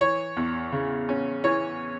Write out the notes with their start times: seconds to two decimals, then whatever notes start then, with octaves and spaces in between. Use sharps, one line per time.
0.01 E3 C#5
0.37 E2
0.72 C#3
1.09 C#4
1.44 E3 C#5